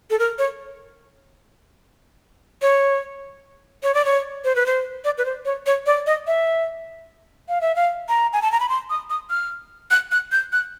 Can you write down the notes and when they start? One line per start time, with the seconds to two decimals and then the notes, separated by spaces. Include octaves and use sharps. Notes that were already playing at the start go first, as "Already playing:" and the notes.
0.10 A4
0.19 A#4
0.38 C#5
2.62 C#5
3.83 C#5
3.95 D5
4.05 C#5
4.44 C5
4.56 B4
4.66 C5
5.05 D5
5.18 B4
5.25 C5
5.45 C#5
5.66 C#5
5.86 D5
6.06 D#5
6.27 E5
7.49 F5
7.61 E5
7.76 F5
8.09 A#5
8.33 G#5
8.42 A5
8.52 A#5
8.60 B5
8.69 C6
8.90 D#6
9.10 D#6
9.30 F6
9.91 F#6
10.12 F#6
10.32 G6
10.53 F#6